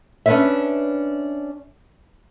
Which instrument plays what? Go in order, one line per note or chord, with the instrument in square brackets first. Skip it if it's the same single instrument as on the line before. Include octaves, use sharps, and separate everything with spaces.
[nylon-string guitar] C#4 D4 F4 B4 C#5 E5